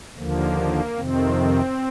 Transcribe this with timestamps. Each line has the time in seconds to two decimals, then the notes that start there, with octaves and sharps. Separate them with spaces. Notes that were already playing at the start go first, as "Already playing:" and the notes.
0.17 D#2 D3 F3 A#3
0.96 F2 C3 D#3 C4